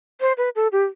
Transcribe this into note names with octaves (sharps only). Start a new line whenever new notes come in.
C5
B4
A4
G4